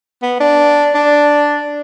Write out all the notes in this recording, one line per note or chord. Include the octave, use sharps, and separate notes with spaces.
B3
D4
D4